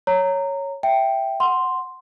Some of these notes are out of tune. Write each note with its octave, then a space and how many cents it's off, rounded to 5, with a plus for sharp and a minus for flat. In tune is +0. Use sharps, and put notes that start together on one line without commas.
C#5 +0 A#5 -15
E5 +0 G5 +0
F#5 +0 C6 +0